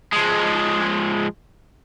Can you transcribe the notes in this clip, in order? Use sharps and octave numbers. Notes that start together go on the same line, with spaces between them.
F3 G#3